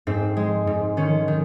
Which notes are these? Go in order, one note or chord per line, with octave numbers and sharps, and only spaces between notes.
G#2 C4
G#3
G#2
D#3 C#4
D#3